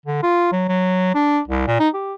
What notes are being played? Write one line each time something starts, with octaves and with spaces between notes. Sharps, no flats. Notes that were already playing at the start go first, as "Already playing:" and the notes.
D3
F4
F#3
F#3
D4
C2
A#2
D#4
G4